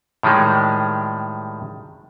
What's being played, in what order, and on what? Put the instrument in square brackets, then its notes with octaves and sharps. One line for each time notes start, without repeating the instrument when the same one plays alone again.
[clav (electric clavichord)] A2 D#3 G3 G#3